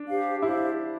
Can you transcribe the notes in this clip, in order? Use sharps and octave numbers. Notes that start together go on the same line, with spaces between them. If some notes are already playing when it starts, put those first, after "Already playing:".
Already playing: D4
G4 C5 F5
E4 G4 C5 F5